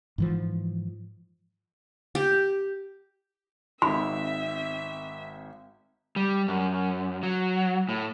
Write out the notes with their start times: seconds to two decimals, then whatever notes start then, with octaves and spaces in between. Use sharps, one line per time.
0.18 G#2 E3 F3
2.15 G4
3.82 G#1 C4 D#4 E5 B5
6.16 G3
6.48 F#2
7.23 F#3
7.89 A2